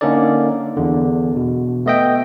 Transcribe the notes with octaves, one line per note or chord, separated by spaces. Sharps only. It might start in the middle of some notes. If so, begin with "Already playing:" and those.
D3 A#3 C#4 D#4 A4 D5
E2 D3
B2
A3 B3 D#5 E5 G5